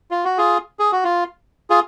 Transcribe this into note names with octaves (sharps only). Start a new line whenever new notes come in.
F4
F#4
F4 G#4
G#4
F#4
F4
F4 G#4